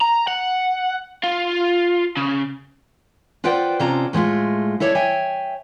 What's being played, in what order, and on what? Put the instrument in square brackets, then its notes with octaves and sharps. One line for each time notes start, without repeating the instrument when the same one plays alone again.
[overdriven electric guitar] A#5
F#5
F4
C#3
[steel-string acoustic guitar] F4 B4 C5 D5 F#5 G5
C3 C#4 F4 A4 D5 A#5
A2 G#3 A3 F4
E4 A4 C#5 D5
C#5 E5 G5 G#5